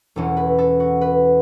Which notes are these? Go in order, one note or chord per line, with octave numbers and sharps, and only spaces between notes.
E1 E2 E3 C#4 A4
B4
A4
F#4
B4